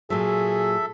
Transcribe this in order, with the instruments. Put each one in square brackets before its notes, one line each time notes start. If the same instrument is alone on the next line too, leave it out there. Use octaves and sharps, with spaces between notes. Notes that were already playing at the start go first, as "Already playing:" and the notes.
[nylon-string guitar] A#2 F#3 [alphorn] G#4 [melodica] A4 E5